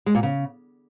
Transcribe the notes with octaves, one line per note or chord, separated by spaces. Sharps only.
G#3
A#2
C#3